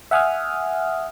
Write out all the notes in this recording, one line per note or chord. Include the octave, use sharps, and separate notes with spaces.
E5 F#5 G#5 D#6 F6